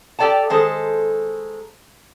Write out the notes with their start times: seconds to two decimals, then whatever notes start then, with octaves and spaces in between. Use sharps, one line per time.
0.19 G4 A4 D5 G5 A5
0.50 D#3 G#3 A4 C5